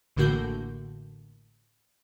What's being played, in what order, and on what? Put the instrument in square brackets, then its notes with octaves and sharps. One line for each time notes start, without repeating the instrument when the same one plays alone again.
[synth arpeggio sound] A1 A2 D3 A#3 F#4 G6